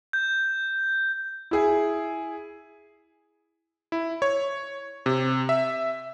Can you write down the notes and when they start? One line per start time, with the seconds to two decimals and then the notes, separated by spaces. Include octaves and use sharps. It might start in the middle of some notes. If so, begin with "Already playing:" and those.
0.13 G6
1.51 E4 G#4
3.92 E4
4.22 C#5
5.06 C3
5.49 E5